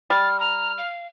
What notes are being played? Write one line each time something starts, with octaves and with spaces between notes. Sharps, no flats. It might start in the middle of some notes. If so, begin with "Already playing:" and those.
G3 F6 A6
A#5 F6
F5